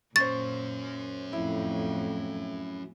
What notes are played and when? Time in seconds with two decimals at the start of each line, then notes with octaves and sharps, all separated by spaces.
0.16 A#2 F#3 C#4 C5 C#6 A6
1.33 F2 A2 E4